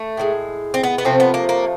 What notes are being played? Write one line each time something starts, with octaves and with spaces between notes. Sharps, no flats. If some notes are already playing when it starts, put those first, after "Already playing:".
Already playing: A3
A2 F3 G#3
C4
B3
B3
C3 F3 A3 C4
B3
A#3
A#3